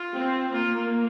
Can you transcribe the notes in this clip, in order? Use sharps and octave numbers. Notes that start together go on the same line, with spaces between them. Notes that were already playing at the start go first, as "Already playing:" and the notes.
Already playing: F4
C4
A#3 F4